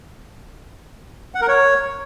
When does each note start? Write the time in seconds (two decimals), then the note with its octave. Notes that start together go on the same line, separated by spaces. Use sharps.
1.35 F#5
1.41 A#4
1.48 C#5